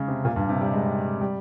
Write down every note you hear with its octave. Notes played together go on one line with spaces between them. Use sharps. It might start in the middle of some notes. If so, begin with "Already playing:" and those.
Already playing: C#3 G#3
C3
A#2
G2
C3
G3
G#3
G3